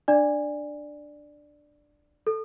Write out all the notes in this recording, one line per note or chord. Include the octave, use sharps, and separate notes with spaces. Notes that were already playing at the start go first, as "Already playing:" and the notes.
D4 D5
A4